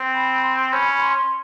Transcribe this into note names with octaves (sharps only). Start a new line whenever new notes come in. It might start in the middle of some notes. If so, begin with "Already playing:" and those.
Already playing: C4
B5
C6
C#4 B5
C6